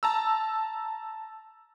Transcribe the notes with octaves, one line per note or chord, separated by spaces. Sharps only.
A5 A#5 E6